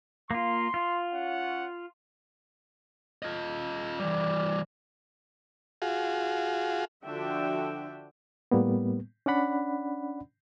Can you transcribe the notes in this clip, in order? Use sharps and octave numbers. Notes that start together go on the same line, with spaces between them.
A#3 F4 C6
F4
C#4 C#5 F#5
F4 D#5
E3 G3 D5
F4 F#4 G#4
D3 F3 D4 F#4 E5 G5
A2 G3 A#3 B3
C#4 D4 D5 F#5 B5